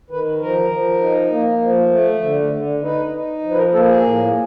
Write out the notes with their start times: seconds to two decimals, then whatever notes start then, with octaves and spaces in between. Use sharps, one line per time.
0.10 D#3 B4
0.40 F3 A#4
0.71 F3
1.01 D#4
1.31 A#3
1.61 F3
1.91 A3
2.22 D3
2.53 D3
2.82 D#4 B4
3.13 D#4
3.43 F3
3.51 B4
3.57 A#4
3.73 A#3 A4
3.88 G#4
4.04 A2